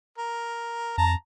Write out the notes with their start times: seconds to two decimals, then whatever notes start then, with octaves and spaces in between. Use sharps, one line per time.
0.18 A#4
0.98 F2 A5 A#5